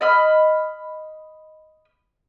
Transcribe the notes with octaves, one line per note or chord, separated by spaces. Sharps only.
D#5 B5 F6